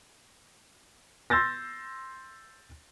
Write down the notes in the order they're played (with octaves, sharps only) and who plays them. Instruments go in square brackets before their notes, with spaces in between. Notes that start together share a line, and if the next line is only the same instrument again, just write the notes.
[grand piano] C6 E6 G6 A6 A#6